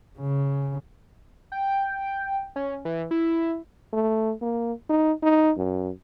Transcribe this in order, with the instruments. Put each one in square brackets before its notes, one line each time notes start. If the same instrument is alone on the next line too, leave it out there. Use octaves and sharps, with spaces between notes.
[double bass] C#3
[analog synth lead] G5
C#4
E3
E4
[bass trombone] A3
A#3
D#4
D#4
F#2